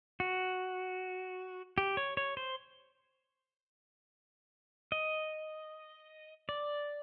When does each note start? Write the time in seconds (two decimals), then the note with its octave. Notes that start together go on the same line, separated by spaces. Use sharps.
0.20 F#4
1.78 G4
1.97 C#5
2.17 C#5
2.37 C5
4.92 D#5
6.49 D5